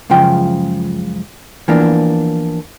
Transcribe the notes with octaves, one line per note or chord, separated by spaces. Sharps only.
C#2 F#2 C#3 F3 G5
E3 F3 A#3 B3 D4